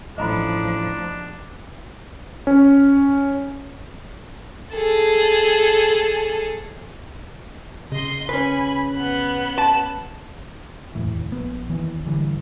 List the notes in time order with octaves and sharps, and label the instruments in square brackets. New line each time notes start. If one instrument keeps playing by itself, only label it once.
[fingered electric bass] A1 A2 [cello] F3 [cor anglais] D4 [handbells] D#5 A#5 B5
[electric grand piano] C#4
[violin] G#4 A4
[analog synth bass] C#3 [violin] D#5 C6
[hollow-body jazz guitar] C#4 B4 [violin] G#5 B5
[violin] B3 F#6
[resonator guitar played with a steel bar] A5
[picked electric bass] F1 D#2 A2 E3
A#1 B3
D#2 E3 B3
G1 D3 E3 G3